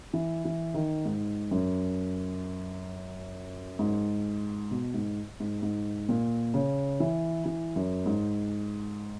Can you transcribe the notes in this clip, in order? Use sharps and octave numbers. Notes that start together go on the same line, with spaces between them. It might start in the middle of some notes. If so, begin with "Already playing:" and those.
E3
E3
D#3
G#2
F#2
G#2
B2
G#2
G#2
G#2
A#2
C#3
E3
E3
F#2
G#2